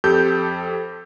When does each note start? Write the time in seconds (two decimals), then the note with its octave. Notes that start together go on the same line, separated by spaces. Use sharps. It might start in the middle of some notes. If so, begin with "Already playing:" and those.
0.04 F2 G4 A4 G6